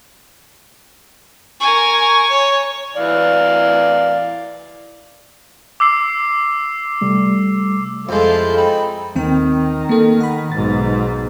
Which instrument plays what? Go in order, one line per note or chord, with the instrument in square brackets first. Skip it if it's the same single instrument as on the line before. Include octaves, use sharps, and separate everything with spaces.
[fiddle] A#4 G#5 [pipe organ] C#6
[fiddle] C#5
[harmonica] E3 D5 F5
[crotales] D6 E6 C7
[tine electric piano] C3 G3 A3
[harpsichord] F2 G#3 [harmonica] E4 F4 C5 [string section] A4
[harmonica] C4 D#4 B5
[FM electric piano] D#2 C4 G5 [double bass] D#3
[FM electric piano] A#3 A4
F#5 B5
[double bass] B1 G#2 [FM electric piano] A6